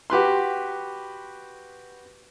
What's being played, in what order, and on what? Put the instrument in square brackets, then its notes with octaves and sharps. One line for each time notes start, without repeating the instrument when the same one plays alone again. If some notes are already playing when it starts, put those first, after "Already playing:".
[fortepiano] F#4 G4 B4 C6